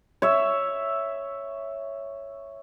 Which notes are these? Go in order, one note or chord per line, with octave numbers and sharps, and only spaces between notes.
C#5 E5